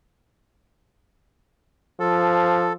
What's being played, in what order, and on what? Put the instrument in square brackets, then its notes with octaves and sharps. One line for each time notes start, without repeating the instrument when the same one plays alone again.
[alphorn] F3 [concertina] A4